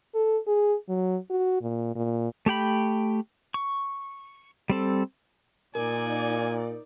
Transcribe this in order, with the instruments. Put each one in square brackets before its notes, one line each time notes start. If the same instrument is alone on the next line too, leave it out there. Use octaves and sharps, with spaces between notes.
[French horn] A4
G#4
F#3
F#4
A#2
A#2
[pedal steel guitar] A3 G4 G5 B5
C#6
G3 C4 A4
[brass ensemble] A#2 [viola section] D#4 D5 [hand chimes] A#4 [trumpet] G#5